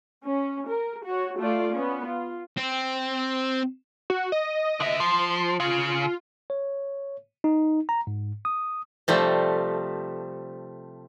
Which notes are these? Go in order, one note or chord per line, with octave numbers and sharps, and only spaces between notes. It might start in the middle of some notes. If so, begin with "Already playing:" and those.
C#4
A#4
F#4 C#5
A3 F4 D5
B3 C#4
F4
C4
F#4
D#5
D3 E5
F3 C6
C#3 F4
C#5
D#4
A#5
G#2
D#6
C3 F3 G3 A3